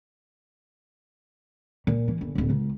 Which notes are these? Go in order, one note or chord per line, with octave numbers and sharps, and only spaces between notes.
A#2
E3
G1
D1 B1
C#2